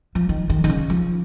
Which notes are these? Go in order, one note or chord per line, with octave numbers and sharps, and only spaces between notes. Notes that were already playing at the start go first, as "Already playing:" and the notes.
F3
D#3
D#3
D#3
C#3
F3